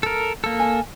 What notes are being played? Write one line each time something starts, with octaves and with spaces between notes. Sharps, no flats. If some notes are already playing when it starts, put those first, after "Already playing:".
A4 A#4
A#3 A4
G#5